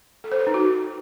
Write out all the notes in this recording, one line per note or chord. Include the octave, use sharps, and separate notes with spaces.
A4
C5
B4
D#4
F#4